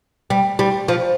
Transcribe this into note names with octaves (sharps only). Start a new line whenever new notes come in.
G3
G3
F3